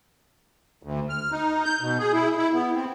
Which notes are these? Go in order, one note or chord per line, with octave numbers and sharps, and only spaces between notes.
D2
F6
D#4
G6
B2
G#4
E4
E4
B3
C4